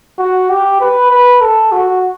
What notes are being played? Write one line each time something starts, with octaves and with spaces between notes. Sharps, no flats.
F#4
G4
B4
B4
A4
F#4